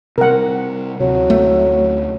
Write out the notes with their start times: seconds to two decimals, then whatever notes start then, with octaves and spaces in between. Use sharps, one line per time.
0.18 C3 G3 A#4 F#5
1.00 D2 C3 F#3
1.30 A3